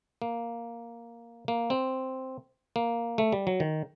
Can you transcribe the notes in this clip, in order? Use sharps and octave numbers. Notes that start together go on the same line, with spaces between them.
A#3
A#3
C4
A#3
A3
G3
F#3
D#3